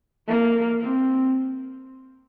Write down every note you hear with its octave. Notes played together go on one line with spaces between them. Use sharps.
A#3
C4